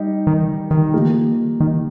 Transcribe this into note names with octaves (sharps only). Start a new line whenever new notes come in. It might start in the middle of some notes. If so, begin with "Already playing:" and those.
Already playing: G3 D#4 G4
D#3
D#3
F3 A#3 G4
D#3